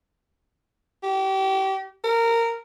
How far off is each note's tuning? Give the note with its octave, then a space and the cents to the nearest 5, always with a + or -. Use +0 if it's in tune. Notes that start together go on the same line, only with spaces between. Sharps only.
G4 -30
A#4 -15